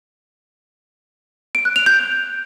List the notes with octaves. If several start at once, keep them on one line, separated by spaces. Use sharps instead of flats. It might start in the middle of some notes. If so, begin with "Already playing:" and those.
D7
F#6
F7
G6